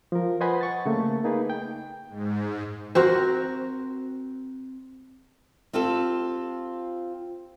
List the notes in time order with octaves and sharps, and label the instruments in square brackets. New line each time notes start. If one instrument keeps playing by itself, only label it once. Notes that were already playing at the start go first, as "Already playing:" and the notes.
[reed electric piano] F3 A#4
B4 C5 D#5 F#5 G#5 B5
F#5 C#6 A6
C#3 A3 A#3
A#3 D#4 G#4 B4
G5
[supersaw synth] G#2
[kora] C4 F#4 A#4
[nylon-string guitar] C4 F4 G4 A4